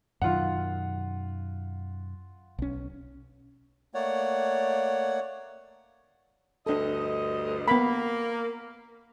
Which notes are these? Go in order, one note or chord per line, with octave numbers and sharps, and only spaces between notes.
F#2 B2 D#3 F4 F#5
B1 C#4
A3 A#3 C#5 D5 F#5
D2 G2 D4 A4 D#5
A#3 B3 B5